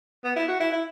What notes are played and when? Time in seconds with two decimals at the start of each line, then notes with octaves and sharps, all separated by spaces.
0.24 B3
0.36 E4
0.48 F#4
0.60 E4
0.72 E4